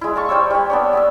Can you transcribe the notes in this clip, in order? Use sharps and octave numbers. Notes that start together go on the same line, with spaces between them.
G#3 E4
F5 A5 C#6
G3 C5 C#5 E6
G3 B5
B3 D4 C#5
B3 E5 E6